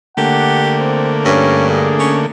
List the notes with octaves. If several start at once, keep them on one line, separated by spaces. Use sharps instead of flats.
D3 A3 A#3 G4 F#5
C4
G2 C#4
G#4
C#4